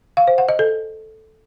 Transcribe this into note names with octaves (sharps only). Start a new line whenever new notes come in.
F5
C5
F#5
D#5
A4